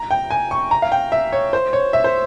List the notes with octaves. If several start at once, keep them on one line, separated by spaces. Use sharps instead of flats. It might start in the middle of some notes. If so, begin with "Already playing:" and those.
Already playing: A#5
G5
G#5
C#6
A#5
F5
G5
E5
C#5
C5
C#5
E5
C5